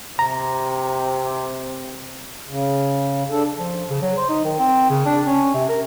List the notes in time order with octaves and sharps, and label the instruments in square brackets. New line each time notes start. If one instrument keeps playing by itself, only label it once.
[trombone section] C3 [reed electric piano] A#5
[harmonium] C#3
D4 A4
[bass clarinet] F3
C#3
F#3
C5
D#4
D#3
C4
C#3
D4
C#4
C3
A#4